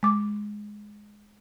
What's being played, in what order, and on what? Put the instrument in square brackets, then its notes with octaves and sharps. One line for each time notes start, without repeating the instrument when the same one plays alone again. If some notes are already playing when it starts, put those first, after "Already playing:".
[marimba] G#3 D6